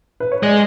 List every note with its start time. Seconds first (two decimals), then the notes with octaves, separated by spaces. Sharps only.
0.20 B4
0.32 C#5
0.43 G#3 D5